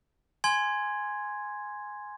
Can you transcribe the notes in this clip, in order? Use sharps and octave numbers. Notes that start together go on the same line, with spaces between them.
G#5 C6 G#6